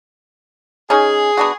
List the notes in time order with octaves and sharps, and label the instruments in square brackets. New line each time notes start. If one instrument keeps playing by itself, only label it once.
[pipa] C#4 D#4 [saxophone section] G#4
[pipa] B3 D4 F#4